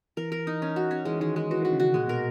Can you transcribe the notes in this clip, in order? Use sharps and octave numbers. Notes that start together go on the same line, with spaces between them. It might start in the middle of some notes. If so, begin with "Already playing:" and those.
E3 A#4
A#4
D#4
C#4
F#4
C#4
E3 G#3
D#3 G#3
G#3
E3 F#4
D#3
F#4
C#3
F#4
A#2 G#3
B2 A#4